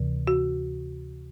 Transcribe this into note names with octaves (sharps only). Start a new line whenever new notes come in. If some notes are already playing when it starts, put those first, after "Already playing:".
Already playing: D2 C3 E3
F#4